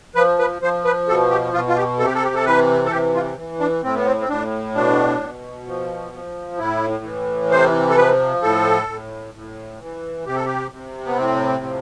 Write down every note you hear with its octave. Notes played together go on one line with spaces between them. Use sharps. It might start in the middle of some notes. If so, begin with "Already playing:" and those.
F3 B4
B4
F3 C5
B4
B2 A4
G4
B2 F4
F4
G4
C3 A4
G4
A4
G4
A4
E3 B4
A4
C3 G4
F4
E3
D4
A2 C4
B3
C4
C4
A2 D4
B2 D4
B2
F3
F3
A2 E4
E3
C3 C5
A4
F3 B4
A2 A4
A2
A2
E3
C3 G4
A4
G4
C3
B3
A2 C4
F3